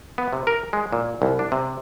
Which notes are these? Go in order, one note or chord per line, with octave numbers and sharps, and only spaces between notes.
B3
C3
A#4
G#3
A#2
C2
D4
C3